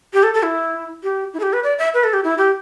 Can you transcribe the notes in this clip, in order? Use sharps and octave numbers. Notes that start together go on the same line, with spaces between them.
G4
A4
A4
E4
G4
E4
A4
G4
B4
D5
E5
B4
A4
G4
E4
G4